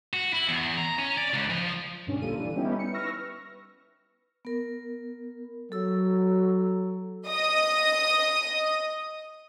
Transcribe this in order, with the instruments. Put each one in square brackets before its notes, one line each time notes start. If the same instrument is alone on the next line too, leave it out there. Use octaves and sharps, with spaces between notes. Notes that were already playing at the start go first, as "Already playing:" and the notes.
[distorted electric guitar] F#4
E4
E2
A#5
C#4
D5
C#2
F3
[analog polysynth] D2 G2 B2 C#4 D4
A#1 G3 A#3 F4 A4 D#7
D3 E3 D4
G3 B3 C#4 D#4 E4 G4
C#7
B4 C#6 E6 F6 A#6
[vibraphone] B3 A#4
[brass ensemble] F#3 [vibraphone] A4 E6
[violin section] D#5 D#6